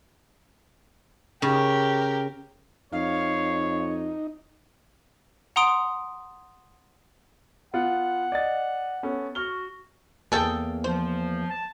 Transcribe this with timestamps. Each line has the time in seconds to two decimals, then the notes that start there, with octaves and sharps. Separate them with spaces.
1.42 C#3 G4 A#4
2.92 F2 D#4 C#5 F5
5.56 F#5 A#5 C6 D#6 D7
7.74 B3 F4 F#5
8.32 D5 D#5 A6
9.03 B3 C#4 A4
9.35 F#4 C#6 F6 G7
10.32 E2 G#2 A#3 G#4 A4 G5
10.84 F3 C5
11.50 A5